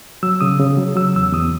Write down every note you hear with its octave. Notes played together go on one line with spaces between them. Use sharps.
F#3 E6
C#3 D#6
C#3
F#3
F#3 E6
E2 E6
E2 D#6